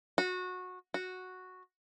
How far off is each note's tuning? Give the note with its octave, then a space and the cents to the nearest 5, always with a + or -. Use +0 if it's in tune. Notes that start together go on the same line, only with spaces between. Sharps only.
F#4 -20
F#4 -5